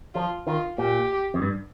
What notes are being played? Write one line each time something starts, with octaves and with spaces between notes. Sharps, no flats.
F3 F4
D#3 F4
A#2 G4
F2
G2